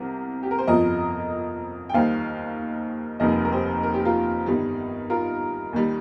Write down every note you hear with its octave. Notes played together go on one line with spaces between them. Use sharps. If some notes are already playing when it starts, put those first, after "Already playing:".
Already playing: C2 C3 A#4
G4
A#4
C5
G1 F2 F3 A#4 D#5
G5
D#2 D#3 G3 C5 F5
F1 D#2 D#3 G3 A#4 D#5
A#4
G4 C5
A#4
G4
F4 A#4
G1 G2 D#3 G3
F4 A#4
D#2 D#3 G3